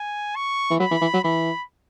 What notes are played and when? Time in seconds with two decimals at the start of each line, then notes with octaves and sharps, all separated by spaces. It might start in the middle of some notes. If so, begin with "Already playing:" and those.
Already playing: G#5
0.36 C#6
0.70 E3
0.80 F#3 B5
0.91 E3
1.01 E3
1.14 F#3
1.24 E3 B5